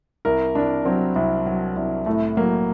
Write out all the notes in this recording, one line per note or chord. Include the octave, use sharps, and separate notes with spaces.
C2 A#4
C2 D4
F#3 C4
C2
F#3
C2
A2 A3
F#3 A#3